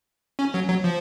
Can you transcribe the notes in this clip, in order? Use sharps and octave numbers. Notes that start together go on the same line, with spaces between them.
C#4
F#3
F#3
F3